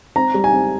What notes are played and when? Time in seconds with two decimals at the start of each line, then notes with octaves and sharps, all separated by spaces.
0.16 C4 A#5
0.34 G3
0.44 G#5
0.52 C4